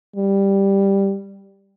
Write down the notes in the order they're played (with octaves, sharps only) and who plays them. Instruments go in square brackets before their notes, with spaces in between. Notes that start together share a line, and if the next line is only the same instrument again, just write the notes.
[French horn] G3